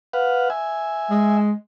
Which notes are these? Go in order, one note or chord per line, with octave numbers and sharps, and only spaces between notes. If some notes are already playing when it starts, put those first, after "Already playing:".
B4 F5 F#5
E5 G#5
G#3